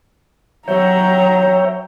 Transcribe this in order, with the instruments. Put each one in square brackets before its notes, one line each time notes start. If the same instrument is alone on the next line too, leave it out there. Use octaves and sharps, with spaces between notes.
[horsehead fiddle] F#3 A#5 [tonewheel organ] C#5 E5 G5